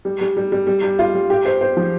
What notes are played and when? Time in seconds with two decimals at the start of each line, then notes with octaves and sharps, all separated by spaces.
0.05 G3
0.21 G3
0.37 G3
0.52 G3
0.67 G3
0.83 G3
0.99 F4
1.15 G3
1.30 G4
1.45 C5
1.61 C5
1.77 F3